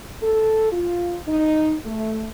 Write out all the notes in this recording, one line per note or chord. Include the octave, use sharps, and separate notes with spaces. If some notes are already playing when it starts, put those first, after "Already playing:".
A4
F4
D#4
A3